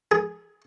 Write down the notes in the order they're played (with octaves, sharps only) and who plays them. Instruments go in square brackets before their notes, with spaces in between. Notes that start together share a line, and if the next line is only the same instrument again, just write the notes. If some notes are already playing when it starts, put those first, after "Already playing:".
[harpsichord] G#4